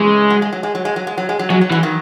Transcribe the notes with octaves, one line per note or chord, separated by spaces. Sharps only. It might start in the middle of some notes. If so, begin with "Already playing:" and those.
Already playing: C#3 E3 G#3
F#3
G#3
F#3
G#3
F#3
G#3
F#3
G#3
F#3
G#3
F#3
F#3 G#3
F#3
E3 G#3
D#3 F#3